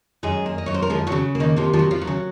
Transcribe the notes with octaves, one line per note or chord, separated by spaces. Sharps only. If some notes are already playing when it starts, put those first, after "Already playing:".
F#2 G#3 G#4
A#3
D#5
F#2 C#5
C5
A#4
F3 G#3 G#4
F#3 F#4
C#3
A#3
D#3 D#4
C3 F3 F4
F3 F4
F#3
F3 F4
F#3
C#3 C#4